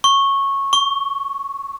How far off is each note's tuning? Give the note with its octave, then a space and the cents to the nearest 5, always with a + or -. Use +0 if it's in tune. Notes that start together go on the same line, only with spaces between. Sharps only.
C#6 -15
C#6 +20